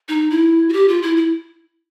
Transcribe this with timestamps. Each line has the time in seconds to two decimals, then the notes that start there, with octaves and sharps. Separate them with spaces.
0.08 D#4
0.30 E4
0.69 F#4
0.73 G4
0.88 F4
1.02 E4
1.17 E4